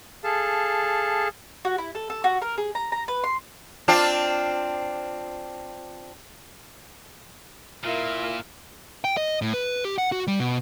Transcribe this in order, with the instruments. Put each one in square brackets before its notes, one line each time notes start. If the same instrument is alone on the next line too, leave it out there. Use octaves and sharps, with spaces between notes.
[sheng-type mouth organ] G#4 A4 F5 A5
[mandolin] F#4
E4
A4
A4
F#4
A#4
G#4
A#5
A#5
B4
C6
[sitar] C4 D4 F4
[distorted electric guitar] A#2 [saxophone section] E4 F4 [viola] A#4 F5 [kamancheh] E5
[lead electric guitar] G5
D#5
A2
B4
G4
F#5
F#4
G3
B2